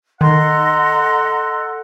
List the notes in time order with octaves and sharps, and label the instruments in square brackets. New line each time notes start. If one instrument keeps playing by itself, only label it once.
[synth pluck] D#3 [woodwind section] A4 F#5 [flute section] D#5 A#5 C6